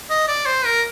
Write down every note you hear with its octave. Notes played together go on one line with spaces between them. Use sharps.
D#5
D5
C5
A#4